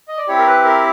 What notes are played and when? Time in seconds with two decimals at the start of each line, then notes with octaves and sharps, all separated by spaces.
0.08 D#5
0.18 D5
0.28 C4 E4 G4 C#5
0.38 A#4
0.47 B4
0.65 A#4